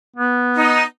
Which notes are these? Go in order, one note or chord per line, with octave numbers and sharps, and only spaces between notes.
B3
D#4